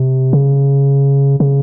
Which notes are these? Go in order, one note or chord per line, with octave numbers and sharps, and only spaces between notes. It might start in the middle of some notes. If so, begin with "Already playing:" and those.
Already playing: C3
C#3
C#3